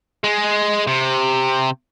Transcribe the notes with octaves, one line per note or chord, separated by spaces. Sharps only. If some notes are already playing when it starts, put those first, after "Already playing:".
G#3
C3